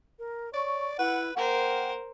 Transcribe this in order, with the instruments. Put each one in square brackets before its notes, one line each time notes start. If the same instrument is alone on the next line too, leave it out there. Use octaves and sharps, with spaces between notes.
[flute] A#4
[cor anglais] C#5 [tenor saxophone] D5 [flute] C#6
[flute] E4 [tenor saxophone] B4 [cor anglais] F#5
[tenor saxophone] A#3 [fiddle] A#4 C5 [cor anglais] F#5 [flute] G5